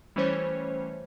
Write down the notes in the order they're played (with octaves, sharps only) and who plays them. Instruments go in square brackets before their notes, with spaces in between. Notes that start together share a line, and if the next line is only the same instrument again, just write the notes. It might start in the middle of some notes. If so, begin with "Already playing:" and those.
[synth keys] E3 G3 A3 C#4 C5 C#5